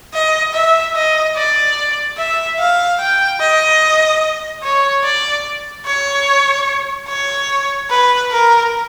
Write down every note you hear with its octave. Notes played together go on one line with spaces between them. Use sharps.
D#5
E5
D#5
D5
E5
F5
G5
D#5
C#5
D5
C#5
C#5
B4
A#4